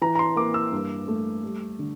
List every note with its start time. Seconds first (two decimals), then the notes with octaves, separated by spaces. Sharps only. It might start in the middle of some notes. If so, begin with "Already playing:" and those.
0.01 E3 A#5
0.15 A#5
0.19 C6
0.36 A#3 D6
0.54 E6
0.72 G2
1.08 A3
1.44 G3
1.79 D3